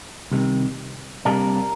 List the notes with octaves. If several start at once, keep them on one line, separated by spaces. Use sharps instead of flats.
C2 C3 D#3
C3 G3 A#3 D4 A#4